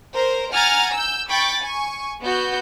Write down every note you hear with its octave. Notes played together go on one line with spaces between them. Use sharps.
A#4 C5
F#5 G#5 A#5 F6 G#6 A6
E6 G6
G5 B5 C#6 A6
G#5 C#6
B3 F#4 G6